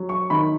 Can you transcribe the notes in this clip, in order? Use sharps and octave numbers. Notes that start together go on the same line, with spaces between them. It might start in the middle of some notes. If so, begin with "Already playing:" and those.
Already playing: F#3
C#6
D#3 B5